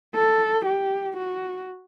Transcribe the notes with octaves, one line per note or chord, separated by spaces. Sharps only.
A4
G4
F#4